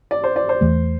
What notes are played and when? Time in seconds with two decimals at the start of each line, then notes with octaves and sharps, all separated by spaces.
0.11 D5
0.24 C5
0.36 D5
0.49 C5
0.61 E2 E3 A3